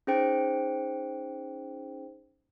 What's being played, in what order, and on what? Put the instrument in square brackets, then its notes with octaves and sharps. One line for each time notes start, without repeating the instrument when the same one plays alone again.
[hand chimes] C#4 D#4 G#4 C5 G5 D7